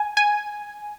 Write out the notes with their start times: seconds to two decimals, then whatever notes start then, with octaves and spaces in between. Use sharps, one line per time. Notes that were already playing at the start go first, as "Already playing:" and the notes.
Already playing: G#5
0.17 G#5